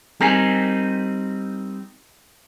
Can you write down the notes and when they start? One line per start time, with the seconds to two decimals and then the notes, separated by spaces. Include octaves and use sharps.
0.21 G3 C4 D#4 A#4 G#5